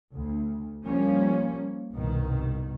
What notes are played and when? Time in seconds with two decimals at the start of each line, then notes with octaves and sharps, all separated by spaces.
0.14 D2
0.85 F3 G3 A#3 C#4
1.92 C2 G2 B2 D#3